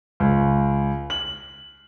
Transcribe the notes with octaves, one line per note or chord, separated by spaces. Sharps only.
C#2
F#7